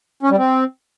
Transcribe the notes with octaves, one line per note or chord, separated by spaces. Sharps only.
C#4
G3
C4